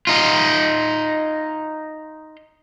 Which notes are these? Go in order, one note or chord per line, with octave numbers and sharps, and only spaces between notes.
D#4 F4